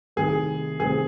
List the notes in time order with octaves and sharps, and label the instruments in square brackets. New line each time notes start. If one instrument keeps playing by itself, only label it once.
[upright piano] C2 C3 D#3 A3 C4 [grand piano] G#4
[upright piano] C2 C3 D#3 A3 C4 [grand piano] G#4